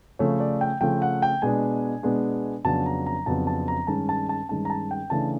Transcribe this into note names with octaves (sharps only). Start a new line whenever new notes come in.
C#3 F3 A3 C#5
D5
G5
C#3 F3 A3 G5
F#5
G5
B2 G#3 B3 D4 G#5
B2 G#3 B3 D4
F2 C#3 F#3 B3 D4 A5
A#5
A#5
F2 C#3 F#3 B3 D4 A5
A5
A#5
G2 D#3 G#3 C#4 A5
A5
A5
G2 D#3 G#3 C#4 A5
A#5
A5
G5
C#3 E3 A3 D4 A5